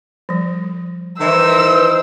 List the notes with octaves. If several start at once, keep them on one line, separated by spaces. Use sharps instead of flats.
F3 G3
D#3 E3 C5 E6